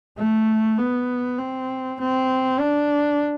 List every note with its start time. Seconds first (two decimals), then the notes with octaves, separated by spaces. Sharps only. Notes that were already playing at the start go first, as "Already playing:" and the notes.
0.18 A3
0.78 B3
1.38 C4
2.00 C4
2.59 D4